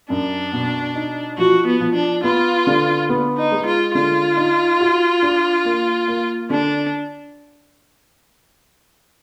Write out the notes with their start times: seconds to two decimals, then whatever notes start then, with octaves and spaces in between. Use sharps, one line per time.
0.10 F#2 D4
0.53 B2
0.95 D#4
1.38 F3 F#4
1.67 B3
1.81 F3
1.95 D4
2.23 B3 F4
2.67 D3
3.09 B3
3.37 D#4
3.52 G#3
3.66 F4
3.95 D3 F4
4.37 D#4
4.80 F#4
5.22 D4
5.65 A#3
6.08 A#3
6.50 D3 D4